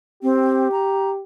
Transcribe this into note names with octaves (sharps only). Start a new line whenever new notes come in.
C4 G4
A#5